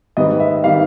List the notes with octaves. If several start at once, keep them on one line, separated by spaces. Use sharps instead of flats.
G#2 D#3 G3 B3 D#5
E5
D#3 G3 B3 F5